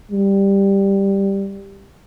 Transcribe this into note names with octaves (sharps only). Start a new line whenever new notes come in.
G3